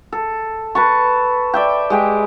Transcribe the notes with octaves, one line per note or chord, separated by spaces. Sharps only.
A4
B4 A5 C#6
D5 E5 G5
G#3 G4 G5